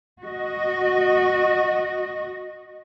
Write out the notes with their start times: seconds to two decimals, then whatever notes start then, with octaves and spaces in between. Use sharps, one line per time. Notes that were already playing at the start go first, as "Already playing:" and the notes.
0.23 F#4 D#5